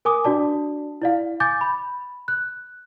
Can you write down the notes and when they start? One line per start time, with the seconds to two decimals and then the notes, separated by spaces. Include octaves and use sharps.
0.05 A#4 G#5 D6 D#6
0.24 D4 F#4 D5 A5
1.02 E4 D5 F5
1.40 G#5 D6 G6 A6
1.61 B5
2.28 F#6